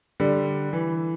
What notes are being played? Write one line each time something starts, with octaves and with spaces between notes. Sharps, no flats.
D3 G3
E3